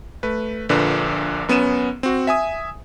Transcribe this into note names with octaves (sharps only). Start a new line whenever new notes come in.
A3 B4
A#1 A#2 D3 B4
F#2 B3 C#4 D#7 E7
C4 F#4
E5 G#5 D#6